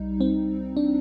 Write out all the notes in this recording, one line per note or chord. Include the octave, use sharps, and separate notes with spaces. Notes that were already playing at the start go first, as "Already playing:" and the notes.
Already playing: C2 G3 D#4
C4
D4